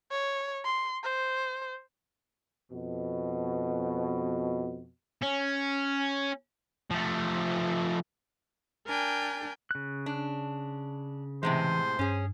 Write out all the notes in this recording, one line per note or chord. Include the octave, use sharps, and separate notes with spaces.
C#5
C6
C5
F2 B2
C#4
F3 A3
D4 A#4 G5 G#5
C#3 F#6
D4
A2 C3 E3 G#3 C5
G2 C#4 G#4